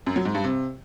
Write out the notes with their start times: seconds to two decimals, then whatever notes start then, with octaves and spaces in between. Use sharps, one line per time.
0.07 F#2
0.16 F#3
0.25 G#2
0.35 G2
0.44 C3